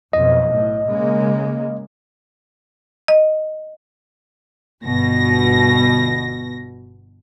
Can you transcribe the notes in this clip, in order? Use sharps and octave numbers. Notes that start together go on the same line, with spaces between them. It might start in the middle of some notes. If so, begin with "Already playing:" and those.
B1 F2 D#5
A2
C#3 G#3 A#3
D#5
G1 B2 A#6